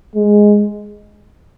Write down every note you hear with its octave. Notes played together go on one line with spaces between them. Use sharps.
G#3